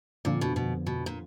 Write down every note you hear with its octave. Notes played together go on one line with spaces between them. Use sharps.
F2 A#2 D3 F3
B2
B2
B2
A#2